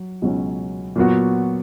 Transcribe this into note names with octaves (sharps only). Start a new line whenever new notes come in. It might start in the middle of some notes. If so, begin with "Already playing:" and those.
Already playing: F#3
C#2 B2 F#3 C#4
A#2 F#3 B3 F#4